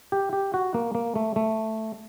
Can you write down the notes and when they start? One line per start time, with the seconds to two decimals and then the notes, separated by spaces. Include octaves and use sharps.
0.12 G4
0.33 G4
0.54 F#4
0.74 A#3
0.95 A#3
1.16 A3
1.36 A3